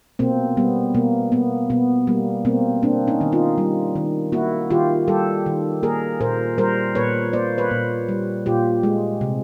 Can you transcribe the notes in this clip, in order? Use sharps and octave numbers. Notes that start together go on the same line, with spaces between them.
B2 A#3 C4
G3 B3
B2 A#3
A#3 B3
B2 B3
G3 A#3
B2 A#3 C4
A#3 C4 D4
C#4 D#4
D#3
D#4 F4
G3
D#3
A#3 E4 F#4
D#3 F4 G4
G3 G4 A4
D#3
A#3 G#4 A#4
A#2 A#4 C5
G3 A#4 C5
A#2 B4 C#5
A#3 C5 D5
B4 C#5
A#2
G3
A#2 F4 G4
G#3
C3